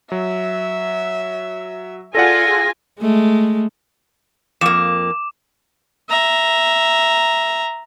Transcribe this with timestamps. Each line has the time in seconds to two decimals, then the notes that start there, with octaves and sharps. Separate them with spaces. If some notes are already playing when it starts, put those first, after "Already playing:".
0.12 F#3 E5
2.15 F4 G#4 A4 D5 F#5 G#5 A#6
3.01 G#3 A3
4.61 F2 A#3 D6 E7
6.10 E5 A#5